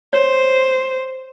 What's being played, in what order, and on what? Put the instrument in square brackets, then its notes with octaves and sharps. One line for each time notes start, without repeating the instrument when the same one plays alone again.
[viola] C5 [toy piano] C#5